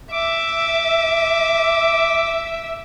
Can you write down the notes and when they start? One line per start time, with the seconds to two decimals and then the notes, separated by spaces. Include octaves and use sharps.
0.12 E5 D6